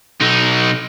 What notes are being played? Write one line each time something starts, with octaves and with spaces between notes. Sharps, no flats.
B1 D#4